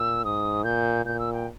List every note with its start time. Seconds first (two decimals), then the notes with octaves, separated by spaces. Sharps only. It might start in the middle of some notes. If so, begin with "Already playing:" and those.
Already playing: A#2 E6
0.24 G#2 D#6
0.64 A#2 G6
1.05 A#2 G6
1.19 E6
1.33 G5